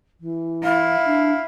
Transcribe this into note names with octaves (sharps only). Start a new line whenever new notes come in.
E3
E4 F5
D4